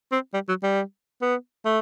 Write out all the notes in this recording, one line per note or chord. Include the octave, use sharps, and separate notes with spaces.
C4
G3
F#3
G3
B3
A3